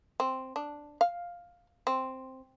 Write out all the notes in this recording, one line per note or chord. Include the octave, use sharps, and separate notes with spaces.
C4
D4
F5
C4